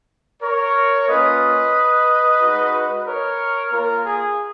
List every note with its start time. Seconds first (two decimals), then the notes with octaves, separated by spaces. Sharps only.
0.43 A#4 C#5
1.08 A#3 C#4 F4 B4 D#5
2.40 G#3 D#4 F#4
3.06 A#4 C#5
3.72 A#3 F4 A#4
4.06 G#4